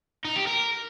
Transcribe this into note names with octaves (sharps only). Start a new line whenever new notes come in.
D#4
G4
A#4